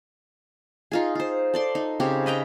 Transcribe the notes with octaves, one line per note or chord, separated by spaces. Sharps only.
D#4 F4 G#4
F4 C5
A4 D5 C6
D#4
C#3 C4 G4
B4 D#5 G5 A#5